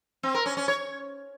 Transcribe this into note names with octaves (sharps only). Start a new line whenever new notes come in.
C4
A#4
C#4
C#4
C#5